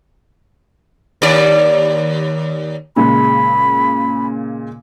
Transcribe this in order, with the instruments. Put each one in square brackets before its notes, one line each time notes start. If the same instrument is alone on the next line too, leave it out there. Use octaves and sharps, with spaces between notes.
[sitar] D#2 D5
[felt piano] A#2 C#3 G#3 [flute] B5